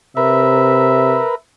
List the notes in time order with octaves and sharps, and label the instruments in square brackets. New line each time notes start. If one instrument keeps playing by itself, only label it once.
[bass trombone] C3 [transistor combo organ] A#4 B4 [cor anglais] E5